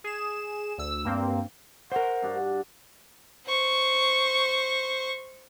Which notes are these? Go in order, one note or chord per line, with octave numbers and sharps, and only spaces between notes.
G#4 E7
D2 E6
G2 A#3 C4
A#4 C5 F#5
G2 D4 F#4
C5 C#6